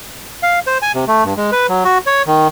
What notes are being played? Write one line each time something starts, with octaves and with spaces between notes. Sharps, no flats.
F5
C5
G#5
C3
A3
G2
G#3
B4
F#3
F#4
C#5
D#3